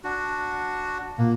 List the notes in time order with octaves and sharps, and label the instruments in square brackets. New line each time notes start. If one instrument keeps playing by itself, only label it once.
[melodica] D4 F#4
[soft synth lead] A#2 [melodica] A#3